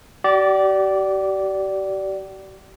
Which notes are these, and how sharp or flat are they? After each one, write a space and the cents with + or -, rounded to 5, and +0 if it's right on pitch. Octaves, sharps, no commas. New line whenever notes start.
G4 -45 D5 -10